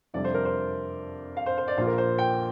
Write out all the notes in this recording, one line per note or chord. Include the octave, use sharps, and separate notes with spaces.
F2 C3 G3 D4 D5
C5
A#4
C5
F5
C5
C5
D5
A#1 A#2 A#3 F4 C5
A#4
C5
G5